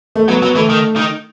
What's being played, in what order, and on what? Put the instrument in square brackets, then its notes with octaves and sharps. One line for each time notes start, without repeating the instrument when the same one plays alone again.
[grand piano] A3
[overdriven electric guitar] F#3 [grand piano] B3
[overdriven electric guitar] F#3 [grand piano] B3
[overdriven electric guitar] E3 [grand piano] A3
[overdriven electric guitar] D#3
D#3